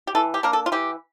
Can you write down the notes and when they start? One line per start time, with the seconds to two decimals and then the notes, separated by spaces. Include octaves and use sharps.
0.07 G4
0.15 E3 A4
0.34 G4
0.43 A#3 D4 A#4
0.53 A4
0.66 F4
0.72 E3 G4